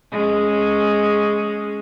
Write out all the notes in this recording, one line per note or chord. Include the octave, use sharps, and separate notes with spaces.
G#3 C#4